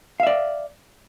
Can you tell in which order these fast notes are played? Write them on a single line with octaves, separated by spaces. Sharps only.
F5 E5 D5